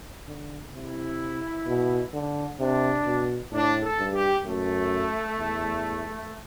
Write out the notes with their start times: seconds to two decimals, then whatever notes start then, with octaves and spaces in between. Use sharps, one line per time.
0.27 D3
0.74 C3 E4
1.67 B2
2.13 D3
2.59 C3 D4
3.06 B2
3.52 A2 D4
3.83 A4
3.99 G2
4.14 G4
4.45 F#2 A3
5.38 E2